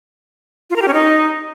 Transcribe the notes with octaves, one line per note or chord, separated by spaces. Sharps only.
F4
A#4
G4
C#4
D#4